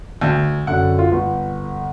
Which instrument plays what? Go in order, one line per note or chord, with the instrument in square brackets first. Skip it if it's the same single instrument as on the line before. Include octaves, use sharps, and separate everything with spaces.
[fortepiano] D2
[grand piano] F#2 D3 [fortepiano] F#5
[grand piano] F4
G1